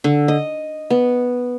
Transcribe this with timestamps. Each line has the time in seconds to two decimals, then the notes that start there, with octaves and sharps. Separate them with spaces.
0.04 D3
0.28 D#5
0.90 B3